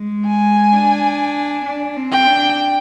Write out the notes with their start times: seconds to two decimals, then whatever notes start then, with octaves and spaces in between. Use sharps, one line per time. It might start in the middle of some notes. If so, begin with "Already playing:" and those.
Already playing: G#3
0.27 G#5
0.73 D4
1.65 D4
1.96 C4
2.11 G5
2.27 D4